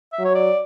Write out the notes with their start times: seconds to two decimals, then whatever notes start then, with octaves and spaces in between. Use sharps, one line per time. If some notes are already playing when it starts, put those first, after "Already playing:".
0.13 E5
0.19 F#3
0.25 C#5
0.35 D5